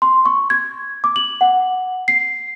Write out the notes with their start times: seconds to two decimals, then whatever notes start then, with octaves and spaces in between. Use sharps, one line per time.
0.02 C6
0.26 C#6
0.50 G#6
1.04 D6
1.16 F#7
1.41 F#5
2.08 C7